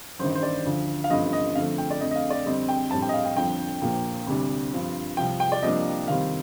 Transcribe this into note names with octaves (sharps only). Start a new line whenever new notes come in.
A1 G2 D#3 C5
C5
D5
D2 D3 F3
F5
A1 G2 F3 A3 C4 D#5
D#5
F2 D3 F3 A3 F5
G5
D5
F2 D3 A3 D#5
D#5
F5
D5
F2 D3 G3 C4 D#5
G5
A#1 A2 G3 C4 A5
G5
D#5
F5
G5
G1 F2 D3 F3 G5
A#1 A#2 F3 A#3
D2 C3 G3 D4
G2 F3 C4
C2 C3 F3 G5
G5
D5
C2 C3 F3 A#3 D4 D#5
F2 C3 D#3 G3 C4 F5